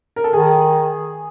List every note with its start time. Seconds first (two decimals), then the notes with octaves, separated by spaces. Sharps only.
0.16 A#4
0.24 A4
0.33 D#3 G#4